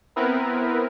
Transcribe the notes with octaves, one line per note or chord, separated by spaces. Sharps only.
B3 C4 E4 A#4 B4